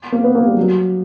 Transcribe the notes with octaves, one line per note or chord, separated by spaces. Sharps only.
A#3
B3
A#3
G3
F#3